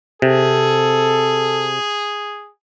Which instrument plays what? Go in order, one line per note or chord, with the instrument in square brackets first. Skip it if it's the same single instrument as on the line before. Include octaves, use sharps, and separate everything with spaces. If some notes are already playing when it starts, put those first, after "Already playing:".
[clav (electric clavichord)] C3 [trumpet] G#4 [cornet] A4